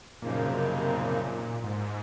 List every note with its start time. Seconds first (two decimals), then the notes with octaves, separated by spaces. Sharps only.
0.22 F#2 A#2 C#3 F3 A#3 D#4
0.46 C3
0.70 C3
0.93 A#2
1.64 G#2